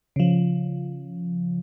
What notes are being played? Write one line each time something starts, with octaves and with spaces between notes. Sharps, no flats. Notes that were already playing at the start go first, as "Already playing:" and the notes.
C#3 F3